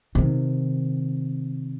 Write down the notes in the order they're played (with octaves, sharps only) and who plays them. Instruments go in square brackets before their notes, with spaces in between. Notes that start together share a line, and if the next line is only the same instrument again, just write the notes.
[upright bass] C3 D#3